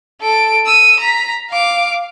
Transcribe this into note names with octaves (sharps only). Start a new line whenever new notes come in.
A4 D7
E6 D#7
A#5 B6
F5 D6